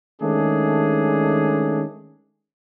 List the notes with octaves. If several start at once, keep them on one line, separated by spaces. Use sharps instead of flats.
D#3 G#3 A3 C#4 D4 G#4